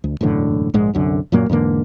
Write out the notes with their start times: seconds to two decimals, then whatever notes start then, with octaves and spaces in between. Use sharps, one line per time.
0.04 D2
0.21 E1 F#2 A2 D3
0.74 A#1 G#2 G#3
0.93 C2 F#2 D3
1.32 F#2 A#2 F#3 A#3
1.49 E2 G#2 D3 A#3